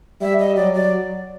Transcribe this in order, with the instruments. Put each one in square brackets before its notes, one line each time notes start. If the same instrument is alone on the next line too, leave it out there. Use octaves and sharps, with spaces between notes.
[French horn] G3 [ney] E5
[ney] D#5
[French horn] F#3 [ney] D5
[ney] D5